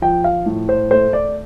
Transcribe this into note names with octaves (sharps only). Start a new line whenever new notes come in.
F3 G5
F5
A2
C5
A3 C5
D5